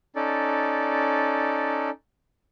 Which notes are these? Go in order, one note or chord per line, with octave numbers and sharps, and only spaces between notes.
C#4 D#4 A4 D5